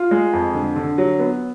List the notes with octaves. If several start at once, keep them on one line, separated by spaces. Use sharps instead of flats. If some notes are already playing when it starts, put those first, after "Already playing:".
Already playing: F4
G#3
F2
D3
D3
F#3
B3